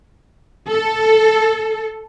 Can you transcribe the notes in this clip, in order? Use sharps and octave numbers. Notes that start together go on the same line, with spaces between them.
A4